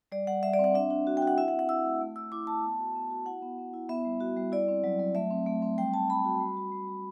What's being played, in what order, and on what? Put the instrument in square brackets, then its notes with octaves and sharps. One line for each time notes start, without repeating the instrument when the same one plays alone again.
[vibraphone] G3 D5
G3 F#5
G3 E5
D5
C4
F#5
D4 E5
D4
F#4
G5
F#4
F#5
E4 E5
F#5
C4
F#5
E4 E6
A3
A3
A3 E6
E4 D6
A3 A5
B3
F#4
B3
F#4
E4 F#5
B3
B3
E4
B3 E5
G3
F#4
G3
E4 D5
C4
F#3
F#3
A3 E5
C4
A3
C4
G3 G5
G3 A5
G3 B5
F#4
G3
F#4
G3
G3